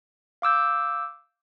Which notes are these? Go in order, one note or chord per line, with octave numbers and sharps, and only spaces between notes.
F5 D6 E6 G6